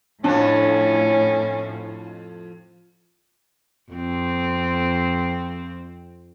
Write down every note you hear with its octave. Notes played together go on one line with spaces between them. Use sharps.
F2 A2 F3 C#4 D4
F2 C4